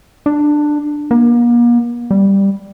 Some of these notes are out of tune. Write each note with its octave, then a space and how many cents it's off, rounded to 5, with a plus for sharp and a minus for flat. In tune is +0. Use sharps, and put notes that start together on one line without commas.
D4 +15
A#3 +40
G3 +5